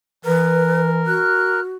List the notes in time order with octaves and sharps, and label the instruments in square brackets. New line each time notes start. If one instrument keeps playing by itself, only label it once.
[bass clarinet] E3 [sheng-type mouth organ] A#4 [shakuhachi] B4
[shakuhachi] F#4 [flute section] F6 F#6